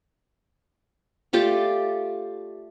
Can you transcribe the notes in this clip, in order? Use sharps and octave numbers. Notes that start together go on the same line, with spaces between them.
A3 F4 G4 D5